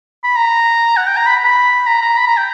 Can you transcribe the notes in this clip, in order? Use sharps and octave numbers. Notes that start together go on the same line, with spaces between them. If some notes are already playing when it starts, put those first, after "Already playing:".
B5
A#5
F#5
G5
A#5
B5
B5
A#5
A#5
B5
A#5
G5